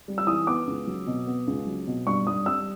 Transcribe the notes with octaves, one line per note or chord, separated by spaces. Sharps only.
G3
E6
E3 D#6
B3 D6
C#2
F#3
B2
B3
C#2
F#3
B2
G2 C#6
G2 D#6
G3 E6